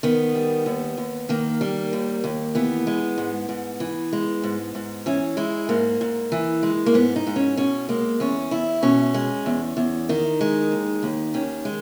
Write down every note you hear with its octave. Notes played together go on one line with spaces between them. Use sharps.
D#3 B3
G3
D#2
D#2
D#3 A#3
G3
D#2
D#2
E3 B3
G#3
G#2
G#2
E3
G#3
G#2
G#2
E3 C#4
G#3 E4
G#2 A#3
G#2
E3
G#3
A#3
G#2 B3
D#4
G#2
C#4
B2 C#4
G#3 A#3
E2 C#4
E2 E4
B2 C#4
G#3
E2
E2
D#3 D#4
G#3
D#2
D#2
D#3 C#4
G#3